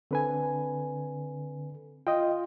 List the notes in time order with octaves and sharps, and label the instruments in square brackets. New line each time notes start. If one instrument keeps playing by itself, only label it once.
[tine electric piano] D3 [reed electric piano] C4 B4 G#5
[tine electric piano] F4 [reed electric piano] D#5 G5